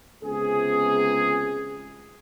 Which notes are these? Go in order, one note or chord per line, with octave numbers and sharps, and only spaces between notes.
C#2 C3 B3 G#4